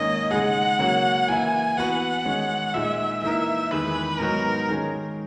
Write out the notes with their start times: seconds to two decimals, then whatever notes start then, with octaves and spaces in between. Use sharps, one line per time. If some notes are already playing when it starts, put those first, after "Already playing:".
Already playing: G#2 D#3 A#3 C#4 D#5
0.31 C#3 G#3 D#4 G#4 F#5
0.79 C#3 F#3 A#3 C#4 F#4
1.28 E3 A#3 E4 G#5
1.77 E3 B3 F#4 B4 F#5
2.25 D#3 G#3 C#4
2.74 A#2 G#3 D#4 E5
3.22 E3 A#3 D#4 A#4 E5
3.71 E2 D#3 G#3 D#4 G#4 B4
4.19 G#2 F#3 B3 D#4 F#4 A#4
4.68 D#3 G#3 C#4